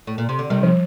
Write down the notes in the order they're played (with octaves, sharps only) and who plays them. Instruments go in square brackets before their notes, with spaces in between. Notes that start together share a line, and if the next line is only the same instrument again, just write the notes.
[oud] A2
A#2
C3
D3
[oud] C3 D#3 [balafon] G3
[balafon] F3